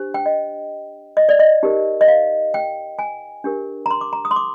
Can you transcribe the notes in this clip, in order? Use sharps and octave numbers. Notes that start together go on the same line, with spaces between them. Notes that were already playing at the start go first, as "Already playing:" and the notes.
Already playing: D4 G4 C5
G5
D#5
D#5
D5
D#5
D#4 G4 A#4
D#5
F5
G5
G#5
D4 G4 A#4
A#5
C6
D6
A#5
D#6
C6
D6